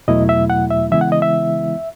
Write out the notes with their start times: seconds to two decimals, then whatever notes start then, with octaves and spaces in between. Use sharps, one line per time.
0.08 E2 B2 F#3 A3 E4 D#5
0.29 E5
0.50 F#5
0.70 E5
0.91 C#3 E3 G#3 B3 E4 E5
1.01 F#5
1.12 D#5
1.22 E5